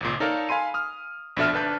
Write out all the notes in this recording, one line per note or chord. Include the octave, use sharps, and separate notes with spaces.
G#1 C#2 A#2
D#4 A4 A#4 C#5 D5 F5
F5 G#5 B5 C6 D#7
D#6 F6
A#1 B2 D4 A4 E5 F6
G#1 D4 B4 A5 G6